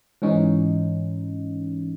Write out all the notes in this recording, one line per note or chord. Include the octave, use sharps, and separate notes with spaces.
G#2 E3 C#4 D#4